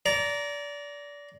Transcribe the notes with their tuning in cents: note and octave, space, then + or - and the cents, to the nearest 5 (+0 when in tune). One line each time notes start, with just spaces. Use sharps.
D5 -25 A#5 +0